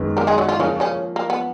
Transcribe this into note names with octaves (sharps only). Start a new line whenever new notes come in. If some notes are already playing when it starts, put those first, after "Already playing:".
Already playing: F#2 D#3 G#3 B3
A#3 A#4
G#3 G#4
F#3 F#4
F3 F4
C#3 F3 A#3 C#4 F4
C#3 C#4
A#3
B3